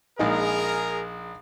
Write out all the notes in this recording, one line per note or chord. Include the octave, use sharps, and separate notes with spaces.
A#1 G#3 D#4 G#4 A#4